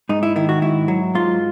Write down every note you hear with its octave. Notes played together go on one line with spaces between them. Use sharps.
G#2 D#4
E4
D#3 E4
F#4
G#2 E4
F#3
G#2 F4